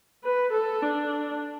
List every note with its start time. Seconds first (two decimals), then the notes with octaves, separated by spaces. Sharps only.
0.24 B4
0.53 A4
0.83 D4